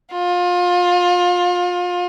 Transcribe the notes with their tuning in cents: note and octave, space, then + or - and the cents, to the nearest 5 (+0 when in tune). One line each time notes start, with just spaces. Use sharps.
F4 +30